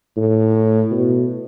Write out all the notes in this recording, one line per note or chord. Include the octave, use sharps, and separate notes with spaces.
A2
B2